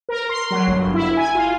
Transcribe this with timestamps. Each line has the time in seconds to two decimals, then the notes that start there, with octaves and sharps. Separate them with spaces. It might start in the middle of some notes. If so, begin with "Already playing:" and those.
0.09 A#4
0.29 C6
0.51 F#3
0.67 G1
0.81 G1
0.94 E4
1.17 G#5
1.35 F4